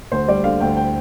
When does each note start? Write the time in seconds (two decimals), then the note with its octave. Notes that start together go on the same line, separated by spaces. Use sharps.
0.12 D2 C5
0.28 G3 D5
0.44 D3 F5
0.60 D2 G5
0.77 G5